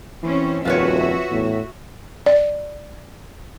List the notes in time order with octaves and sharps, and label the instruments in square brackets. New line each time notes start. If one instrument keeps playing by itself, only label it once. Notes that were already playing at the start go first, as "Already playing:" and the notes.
[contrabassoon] E3 [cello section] C4 C#4
[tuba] D#1 [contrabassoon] F2 [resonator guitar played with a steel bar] F4 B4 C#5 [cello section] F#4 E5
[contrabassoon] E2 [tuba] A2
[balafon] D5